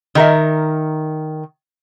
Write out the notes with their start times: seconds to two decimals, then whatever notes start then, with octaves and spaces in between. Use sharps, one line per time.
0.15 D#3 A#4 E5